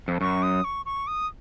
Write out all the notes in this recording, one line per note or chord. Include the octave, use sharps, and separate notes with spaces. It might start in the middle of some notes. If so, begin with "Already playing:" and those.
F2
F#2 C#6
D#6
C#6
C#6
D#6